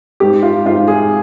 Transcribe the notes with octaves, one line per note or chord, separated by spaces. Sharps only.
G#2 G4
F4
G#2 F4
G#4